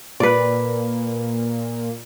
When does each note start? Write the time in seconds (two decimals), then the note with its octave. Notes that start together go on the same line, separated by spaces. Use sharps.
0.20 A#2 B4 D5